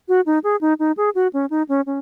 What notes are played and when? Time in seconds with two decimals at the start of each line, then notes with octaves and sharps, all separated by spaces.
0.08 F#4
0.26 D#4
0.44 G#4
0.61 D#4
0.79 D#4
0.97 G#4
1.15 F#4
1.33 C#4
1.50 D#4
1.69 C#4
1.86 C#4